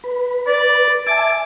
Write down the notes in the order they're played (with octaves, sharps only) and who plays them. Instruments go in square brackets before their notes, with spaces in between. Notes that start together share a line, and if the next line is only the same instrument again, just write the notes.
[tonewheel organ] B4
[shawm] D5
[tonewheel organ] E5 G#5 A5 [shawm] D6